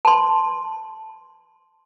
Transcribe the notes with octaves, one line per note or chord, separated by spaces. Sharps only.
A5 C6